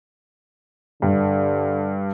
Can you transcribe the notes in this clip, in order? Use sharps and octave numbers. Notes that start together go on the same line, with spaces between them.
G2 D3